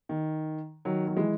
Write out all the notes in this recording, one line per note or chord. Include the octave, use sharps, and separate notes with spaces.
D#3
D#3 F#3
F#3
E3 G#3